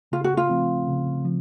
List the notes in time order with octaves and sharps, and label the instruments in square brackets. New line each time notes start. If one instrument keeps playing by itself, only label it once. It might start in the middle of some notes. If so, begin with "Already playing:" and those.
[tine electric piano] C#3 [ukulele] F4
[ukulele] F#4
F4
[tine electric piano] F3 A3 C4
C#3
F3